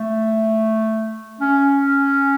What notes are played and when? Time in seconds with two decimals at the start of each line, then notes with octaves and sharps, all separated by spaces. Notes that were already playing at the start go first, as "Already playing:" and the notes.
Already playing: A3
1.41 C#4